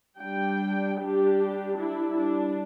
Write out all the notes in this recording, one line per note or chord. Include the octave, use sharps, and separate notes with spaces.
G3 D4 G5
G3 D4 G4
G3 D4 E4
D4